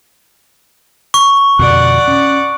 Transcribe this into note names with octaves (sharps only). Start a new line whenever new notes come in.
C#6
F2 B2 D3 D5 F#5
C#4